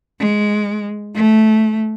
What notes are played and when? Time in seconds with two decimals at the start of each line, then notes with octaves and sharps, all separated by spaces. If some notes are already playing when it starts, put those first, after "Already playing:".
0.19 G#3
1.15 A3